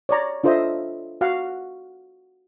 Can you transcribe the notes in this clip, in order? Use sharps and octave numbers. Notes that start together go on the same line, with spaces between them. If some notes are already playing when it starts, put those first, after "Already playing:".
C#5 D5 A#5
D4 F4 A4 C5 D#5 E5
F#4 F5 F#5